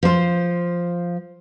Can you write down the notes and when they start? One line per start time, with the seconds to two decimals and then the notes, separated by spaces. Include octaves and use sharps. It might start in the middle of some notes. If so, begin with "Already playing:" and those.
0.03 F3 C5